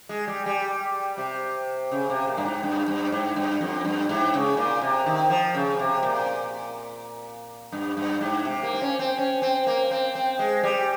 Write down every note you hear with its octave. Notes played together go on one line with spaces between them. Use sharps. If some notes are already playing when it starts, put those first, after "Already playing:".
G#3
G3
G3
C3
C#3
C3
A#2
G2
G#2
G2
G2
G#2
G2
F2
G2
G#2
C#3
A#2
C3
D#3
F3
C#3
C3
A#2
G2
G2
G#2
C3
A#3
C4
C#4
C4
C#4
C4
A#3
C4
C4
G#3
G3